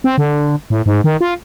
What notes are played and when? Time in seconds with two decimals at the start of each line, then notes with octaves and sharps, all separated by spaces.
0.04 C4
0.18 D3
0.70 A2
0.86 G#2
1.04 D#3
1.21 F4